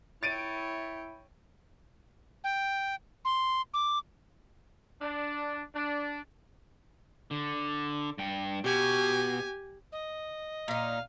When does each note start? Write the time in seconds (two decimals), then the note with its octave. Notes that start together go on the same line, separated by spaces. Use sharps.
0.23 E4 C#5 G5 A6 D7 D#7
2.44 G5
3.25 C6
3.74 D6
5.02 D4
5.75 D4
7.31 D3
8.18 G2 G5
8.64 B2 G4 G#5
9.92 D#5
10.68 A#2 D#4 F5